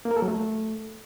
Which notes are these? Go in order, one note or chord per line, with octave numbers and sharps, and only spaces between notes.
A#3
A#4
A4
F#3
A3